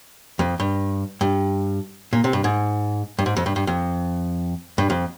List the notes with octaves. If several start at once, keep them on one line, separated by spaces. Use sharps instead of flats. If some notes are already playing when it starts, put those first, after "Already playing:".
F2
G2
G2
A#2
C3
G2
G#2
G2
G#2
F2
G2
G2
F2
G2
F2